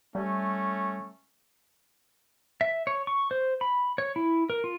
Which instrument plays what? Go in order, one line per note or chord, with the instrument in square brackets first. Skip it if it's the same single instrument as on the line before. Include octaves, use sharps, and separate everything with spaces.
[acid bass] G3 [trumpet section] A3 C#4
[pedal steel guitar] E5
C#5
C#6
C5
B5
C#5
E4
A#4
F4